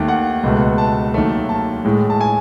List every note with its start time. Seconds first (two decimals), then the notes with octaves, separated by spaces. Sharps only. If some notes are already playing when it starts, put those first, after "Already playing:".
Already playing: D#2 D#3 A3
0.08 F#5
0.43 C#2 B2 A3
0.78 A5
1.14 D#2 D#3 F#3 A3
1.49 A5
1.85 A2 G#3
2.10 A5
2.21 G#5